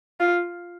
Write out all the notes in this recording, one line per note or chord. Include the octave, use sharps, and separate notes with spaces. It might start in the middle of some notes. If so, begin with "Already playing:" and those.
F4